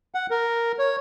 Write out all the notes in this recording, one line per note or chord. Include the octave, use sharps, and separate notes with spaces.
F#5
A#4
C#5